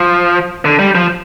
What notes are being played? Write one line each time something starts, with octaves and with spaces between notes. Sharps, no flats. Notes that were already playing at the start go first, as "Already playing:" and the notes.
Already playing: F3
D3
G3
F3